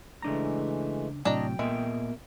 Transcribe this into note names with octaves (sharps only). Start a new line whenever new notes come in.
C#3 E3 G#3 A3 D4 A#5
A2 C3 F#3 D4 D#5 G5 A#5
A#2 G#3 B3 A#4 E5